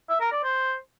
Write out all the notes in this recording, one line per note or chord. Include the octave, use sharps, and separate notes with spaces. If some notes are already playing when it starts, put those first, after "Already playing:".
E5
A#4
D5
C5